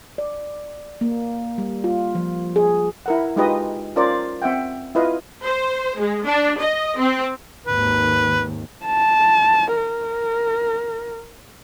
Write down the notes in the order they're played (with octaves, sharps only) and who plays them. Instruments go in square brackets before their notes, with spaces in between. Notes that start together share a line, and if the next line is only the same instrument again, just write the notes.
[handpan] D5
A#3
G3
F4
F3
G#4
[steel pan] E4 A#4 F#5
G#3 D#4 F4 G4 B4 D#5
C#4 F4 A#4 C5 D5
C4 E5 F#5 G5
E4 F4 B4 D#5 F5
[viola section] C5
G#3
D4
D#5
C4
[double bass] G#1 D#2 [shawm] B4
[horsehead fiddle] A5
A#4